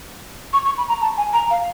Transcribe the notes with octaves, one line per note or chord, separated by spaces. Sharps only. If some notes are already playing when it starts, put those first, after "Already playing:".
C#6
C#6
B5
A#5
A5
G#5
A#5
F5